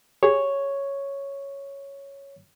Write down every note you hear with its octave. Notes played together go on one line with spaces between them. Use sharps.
G4 G#4 C#5